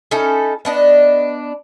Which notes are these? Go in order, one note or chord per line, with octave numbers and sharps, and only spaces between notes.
C#4 D#4 E4 A4
B3 D4 D#5